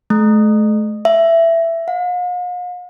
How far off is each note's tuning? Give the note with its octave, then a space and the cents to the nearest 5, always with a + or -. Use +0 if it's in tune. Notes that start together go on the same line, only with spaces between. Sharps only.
A3 -40
E5 +15
F5 +45